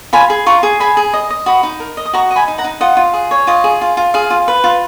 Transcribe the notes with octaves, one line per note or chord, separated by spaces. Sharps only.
F4 G#5 B5
G#4
F4 A#5 C#6
G#4
G#4 G#5 B5
G#4
D#5
D#5
F#4 B5 D#6
D#4
A#4
D#5
D#6
F#4 A#5 C#6
D#5
G#5 B5
D#4
F#5 A#5
D#4
F4 D#5 F#5
F4
G#4
C#5
F4 D#5
G#4
F4
F4
G#4 F5
F4
B4
F4